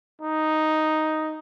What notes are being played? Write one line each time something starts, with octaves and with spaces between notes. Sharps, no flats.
D#4